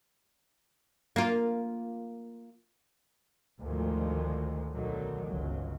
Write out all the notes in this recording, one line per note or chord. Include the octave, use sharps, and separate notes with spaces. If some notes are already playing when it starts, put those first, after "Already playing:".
A#3 F4
D2 G#2 D#3 F3 G#3
B1 D3 D#3 F#3
G1 C#2 F#3